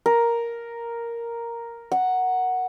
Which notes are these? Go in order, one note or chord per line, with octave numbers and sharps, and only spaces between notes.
A#4
F#5